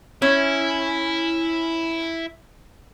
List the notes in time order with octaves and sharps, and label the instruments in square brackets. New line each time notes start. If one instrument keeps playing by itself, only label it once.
[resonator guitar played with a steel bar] C#4 [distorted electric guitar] E4